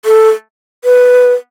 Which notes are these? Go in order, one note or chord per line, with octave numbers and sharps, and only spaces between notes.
A4
B4